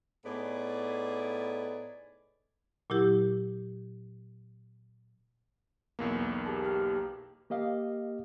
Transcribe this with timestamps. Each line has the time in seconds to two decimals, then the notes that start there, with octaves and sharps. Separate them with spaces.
0.25 A2 B3 D#4 G#4 D5
2.90 A#2 F#3 E4 G4
5.99 B1 E2 A#3
6.46 G4 G#4 A5
6.65 G4 G5 F6
7.50 A#3 G4 D#5 F5